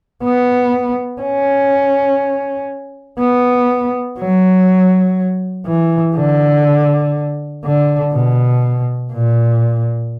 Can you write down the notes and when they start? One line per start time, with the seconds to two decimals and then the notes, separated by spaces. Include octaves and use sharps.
0.23 B3
1.21 C#4
3.19 B3
4.18 F#3
5.66 E3
6.16 D3
7.64 D3
8.13 B2
9.13 A#2